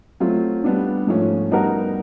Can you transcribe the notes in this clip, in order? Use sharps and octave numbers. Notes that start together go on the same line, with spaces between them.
F#3 A3 C4 F4
G3 B3 D4
G#2 F3 A3 C#4
G3 B3 D#4 F#4 A#4